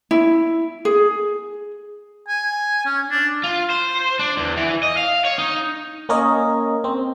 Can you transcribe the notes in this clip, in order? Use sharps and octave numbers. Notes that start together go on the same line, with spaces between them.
E4
G#4
G#5
C#4
D4
F4
C5
D4
E2
E3
D#5
F5
C#5
D#4
A#3 C#4 A#4 C#5 D#5
C4